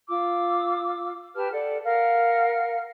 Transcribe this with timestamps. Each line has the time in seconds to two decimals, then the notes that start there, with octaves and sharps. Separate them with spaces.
0.08 F4 D6 E6
1.35 G4 B4 A5 F6
1.52 A4 D5 F#5
1.84 A#4 F5 F#5 F6